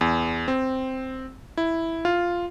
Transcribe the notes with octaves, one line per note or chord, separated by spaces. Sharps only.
E2
C4
E4
F4